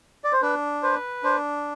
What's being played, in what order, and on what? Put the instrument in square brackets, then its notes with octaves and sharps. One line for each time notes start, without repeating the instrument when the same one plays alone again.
[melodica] D5
C5
[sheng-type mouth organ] D4 [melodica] B4
[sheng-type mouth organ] B4 [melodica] C5
[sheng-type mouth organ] D4 [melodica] C5